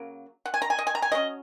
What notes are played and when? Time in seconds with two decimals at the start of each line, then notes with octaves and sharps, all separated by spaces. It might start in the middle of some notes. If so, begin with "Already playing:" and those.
Already playing: C#3 F#3 A#3
0.46 F#5
0.54 G#5
0.62 A#5
0.70 G#5
0.79 D#5
0.87 G#5
0.95 A#5
1.02 G#5
1.12 F#3 C#4 D#5